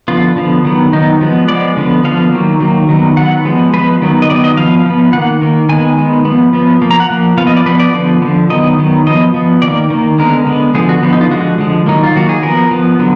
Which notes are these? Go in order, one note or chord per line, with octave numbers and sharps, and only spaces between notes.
D3 F3 B3 F4
D3 F3 B3
D#3 F#3 B3
D#3 F#3 B3 D#4
F3 G#3 B3
F3 G#3 B3 D5
D3 F3 B3
D3 F3 B3 F5
D#3 F#3 A#3
D#3 F#3 A#3
D#3 F#3 B3
D#3 F#3 B3 F#5
F3 G#3 B3
F3 G#3 B3 B4
D#3 F#3 B3
D#5
D#3 F#3 B3 D5
D#5
F3 B3 F5
F3 B3
D#3 A#3 F#5
D#3 A#3
D#3 G#3 B3 G#5
D#3 G#3 B3
F3 B3
F3 B3
F3 A#3
A#5
F#5
F3 A#3
F3 B3 F5
D#5
D5
F3 B3 B4
D5
D3 F3 B3
B3
D3 F3
D#3 F#3 B3 D#5
D#3 F#3 B3
F3 B3 D#5
F3 B3
D#3 A#3 D5
D#3 A#3
D3 G#3 B3 A#4
D3 G#3 B3
D3 F3 B3 G#4
F#4
D3 F3 B3
D#4
F4
D3 F3 G#3 F#4
D3 F3 G#3
D#3 F#3 A#3 D#4
F4
D#3 F#3 A#3 F#4
G#4
F3 B3 A#4
F3 B3
D3 F#3 B3